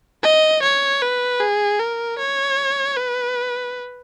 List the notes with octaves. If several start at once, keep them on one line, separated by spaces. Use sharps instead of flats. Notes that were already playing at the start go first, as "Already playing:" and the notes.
D#5
C#5
B4
G#4
A#4
C#5
B4